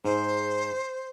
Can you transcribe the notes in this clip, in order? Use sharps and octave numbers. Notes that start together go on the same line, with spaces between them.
G#2 C5